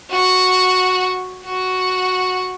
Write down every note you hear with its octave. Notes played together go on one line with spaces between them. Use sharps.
F#4
F#4